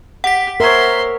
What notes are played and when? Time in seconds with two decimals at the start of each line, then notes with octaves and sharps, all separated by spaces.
0.24 G4 F#5 B6
0.60 A#4 C5 C#5 E5 C6